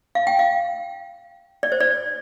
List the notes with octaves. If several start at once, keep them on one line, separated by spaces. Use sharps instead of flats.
F5
G5
F5
D5
C5
D5